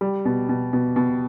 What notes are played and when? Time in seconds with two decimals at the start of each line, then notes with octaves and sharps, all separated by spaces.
0.01 G3
0.25 B2
0.49 B2
0.73 B2
0.96 B2